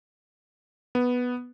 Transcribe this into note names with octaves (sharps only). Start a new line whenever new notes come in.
B3